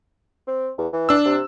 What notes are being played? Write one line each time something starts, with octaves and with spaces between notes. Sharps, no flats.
C4
E2
E3
D4 E6
C3